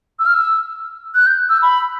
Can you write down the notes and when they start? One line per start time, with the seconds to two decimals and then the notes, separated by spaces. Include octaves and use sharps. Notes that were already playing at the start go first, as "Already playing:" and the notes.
0.19 E6
0.26 F6
0.34 E6
1.15 F#6
1.26 G6
1.50 E6
1.62 B5